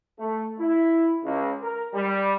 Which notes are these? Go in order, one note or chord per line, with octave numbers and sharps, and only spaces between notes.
A3
E4
C#2
A#4
G3